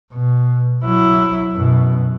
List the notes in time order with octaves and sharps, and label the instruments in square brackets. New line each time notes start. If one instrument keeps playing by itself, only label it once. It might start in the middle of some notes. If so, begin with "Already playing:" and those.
[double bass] B2
F#3 E4
F#2 B2